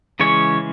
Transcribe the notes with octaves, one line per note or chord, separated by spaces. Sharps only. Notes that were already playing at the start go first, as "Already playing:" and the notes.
C#3 E3 G#3 C#4 C#5